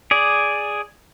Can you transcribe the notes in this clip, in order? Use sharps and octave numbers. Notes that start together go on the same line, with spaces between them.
G#4 D5